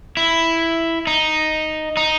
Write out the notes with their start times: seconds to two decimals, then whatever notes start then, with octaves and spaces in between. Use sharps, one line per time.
0.17 E4
1.07 D#4
1.97 D#4